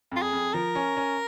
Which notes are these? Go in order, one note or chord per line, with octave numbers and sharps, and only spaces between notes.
F2 F4
G#4
F2
F3 A#4
C#4
C#4